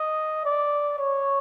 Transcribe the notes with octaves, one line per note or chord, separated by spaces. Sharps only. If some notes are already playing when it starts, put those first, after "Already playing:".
Already playing: D#5
D5
C#5